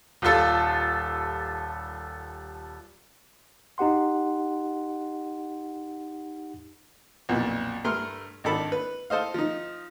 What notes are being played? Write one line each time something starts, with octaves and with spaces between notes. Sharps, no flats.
D#1 G3 F4 A4
D#4 G4 F#5 C6
B1 F2 A#2
G2 A3 A#4 C6 F6
G#1 D#3 D4 A4 B5
B4
A4 C5 D#5 F5
F3 D#4